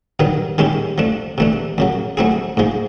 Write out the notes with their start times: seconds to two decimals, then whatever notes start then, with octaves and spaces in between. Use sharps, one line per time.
0.19 G2 D#3 F#3 B3
0.58 D#3 G#3 C#4 E4 G4
0.98 F3 A3 D4
1.38 C3 E3 A3 D4
1.78 F#2 C#3 F#3
2.17 F#3 A3 C4 E4 G#4
2.57 G#2 F3 G#3